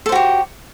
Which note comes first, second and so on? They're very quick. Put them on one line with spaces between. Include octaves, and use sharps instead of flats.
A4 C5 F#4 G4